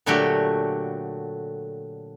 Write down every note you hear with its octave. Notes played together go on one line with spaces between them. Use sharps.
A#2 D3 F#3 A3 F#4 G4